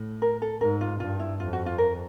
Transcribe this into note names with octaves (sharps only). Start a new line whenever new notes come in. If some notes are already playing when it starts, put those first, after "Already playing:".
Already playing: A2
A#4
A4
G#2 A#4
F4
G2 F4
E4
F2 F4
F#4
F4
A#4